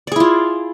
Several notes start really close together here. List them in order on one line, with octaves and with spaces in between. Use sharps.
D5 G#4 E4 F4